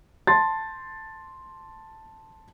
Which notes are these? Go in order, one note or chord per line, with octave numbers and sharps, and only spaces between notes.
A5 C6 A6